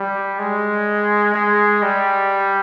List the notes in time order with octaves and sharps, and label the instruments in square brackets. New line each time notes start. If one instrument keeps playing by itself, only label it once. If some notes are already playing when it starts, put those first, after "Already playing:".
Already playing: [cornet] G3
G#3
G#3
G3